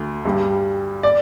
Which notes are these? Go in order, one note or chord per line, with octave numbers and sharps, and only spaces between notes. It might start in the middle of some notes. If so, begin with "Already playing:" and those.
Already playing: D2 D3
G2 G3
D5